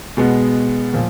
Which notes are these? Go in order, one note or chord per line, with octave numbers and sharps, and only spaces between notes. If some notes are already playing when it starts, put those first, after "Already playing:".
B2 G#3 B3
A#2 F3